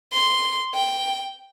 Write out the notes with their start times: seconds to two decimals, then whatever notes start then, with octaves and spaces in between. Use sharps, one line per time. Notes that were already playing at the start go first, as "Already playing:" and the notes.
0.12 C6
0.74 G5